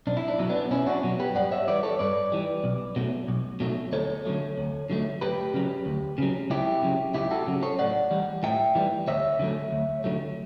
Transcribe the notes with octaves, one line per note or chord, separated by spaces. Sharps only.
B1 D4
E4
D4
B2 F#3 E4
B3 D4
B1 C#4 E4
D4 F#4
B2 F#3
G4 B4
G2 D5 F#5
C#5 E5
E3 G3 B4 D5
A4 C#5
G2 B4 D5
E3 G3
B1
B2 F#3 A3
B1
B2 F#3 A3
D2 A4 C#5
D3 F#3 A3
D2
D3 F#3 A3
D2 G4 B4
C#3 F#3
D2
C#3 F#3
C#2 E4 G4
C#3 F#3
C#2 E4 G4
F#4 A4
C#3 F#3
A4 C#5
A2 D5 F#5
E3 G3
A2 E5 G5
E3 G3
D2 C#5 E5
D3 F#3 A3
D2
D3 F#3 A3